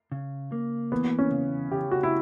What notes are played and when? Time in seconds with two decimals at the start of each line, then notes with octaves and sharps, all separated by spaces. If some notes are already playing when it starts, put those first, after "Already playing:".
0.12 C#3
0.52 A#3
0.92 E3 B3
1.19 C#4
1.31 C#3
1.71 C#3 G4
1.91 F#4
2.03 E4